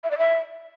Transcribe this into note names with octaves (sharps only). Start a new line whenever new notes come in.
E5
D5
E5